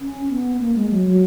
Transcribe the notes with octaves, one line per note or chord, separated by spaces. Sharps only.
C#4
B3
A#3
G#3
F#3
F#3